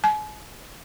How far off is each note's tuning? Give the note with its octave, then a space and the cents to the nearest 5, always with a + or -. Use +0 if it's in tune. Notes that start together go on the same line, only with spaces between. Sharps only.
G#5 +40